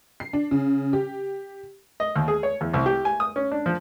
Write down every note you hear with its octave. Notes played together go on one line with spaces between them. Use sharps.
C7
D4
C#3
G4
D#5
D#2
G#4
C#5
E2
C2
G4
G#5
D#6
C#4
D4
F3